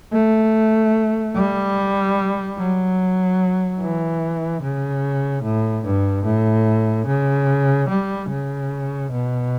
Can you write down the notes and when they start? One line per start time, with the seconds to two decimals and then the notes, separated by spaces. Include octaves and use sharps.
0.12 A3
1.35 G3
2.58 F#3
3.81 E3
4.62 C#3
5.44 A2
5.85 G2
6.25 A2
7.07 C#3
7.89 G3
8.30 C#3
9.12 B2